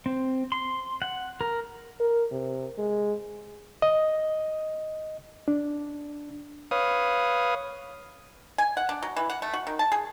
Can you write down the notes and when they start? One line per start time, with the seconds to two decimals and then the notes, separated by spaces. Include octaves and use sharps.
0.06 C4
0.52 C6
1.02 F#5
1.41 A#4
2.00 A#4
2.31 C3
2.78 G#3
3.82 D#5
5.48 D4
6.71 B4 C#5 F5 D#6
8.58 G#5
8.77 F#5
8.89 D4
9.03 F#3
9.16 E3
9.30 F#5
9.42 A3
9.54 F#4
9.67 D#3
9.79 A5
9.92 G#4